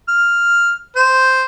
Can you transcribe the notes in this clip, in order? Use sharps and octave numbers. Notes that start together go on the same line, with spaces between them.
F6
C5